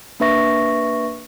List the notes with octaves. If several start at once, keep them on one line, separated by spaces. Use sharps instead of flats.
A#3 D4 B4 E5 C#6 A#6